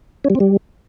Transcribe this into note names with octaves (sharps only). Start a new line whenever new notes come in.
C#4
G3
C4
G3